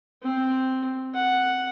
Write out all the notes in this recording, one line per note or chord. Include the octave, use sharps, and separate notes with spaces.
C4
F#5